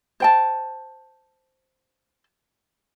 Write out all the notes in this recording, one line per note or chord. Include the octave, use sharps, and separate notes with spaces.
C5 G5 A5